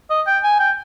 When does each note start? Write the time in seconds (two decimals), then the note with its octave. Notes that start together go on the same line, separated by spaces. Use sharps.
0.10 D#5
0.27 G5
0.43 G#5
0.59 G5